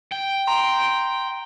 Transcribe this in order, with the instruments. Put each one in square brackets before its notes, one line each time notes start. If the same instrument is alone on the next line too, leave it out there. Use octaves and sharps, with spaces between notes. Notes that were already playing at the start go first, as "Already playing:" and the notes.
[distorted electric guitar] G5
[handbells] A#5 C6